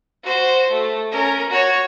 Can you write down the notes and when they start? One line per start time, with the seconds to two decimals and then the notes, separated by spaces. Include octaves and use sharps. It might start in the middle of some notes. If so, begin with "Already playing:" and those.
0.24 F#4 C5
0.70 A3
1.11 C#4 A#4
1.50 F#4 C#5